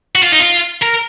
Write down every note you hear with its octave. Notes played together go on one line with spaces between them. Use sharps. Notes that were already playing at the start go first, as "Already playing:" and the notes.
F#4
F4
D#4
F4
A#4